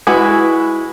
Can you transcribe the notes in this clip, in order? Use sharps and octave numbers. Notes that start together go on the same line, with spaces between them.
G#3 E4 F#4 B4